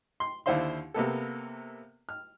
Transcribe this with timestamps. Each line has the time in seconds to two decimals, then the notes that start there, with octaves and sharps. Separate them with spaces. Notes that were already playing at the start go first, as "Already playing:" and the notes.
0.20 C6
0.46 D#2 D3 E4 C5 F5 C6
0.94 C3 A#3 B3 A4
2.09 F6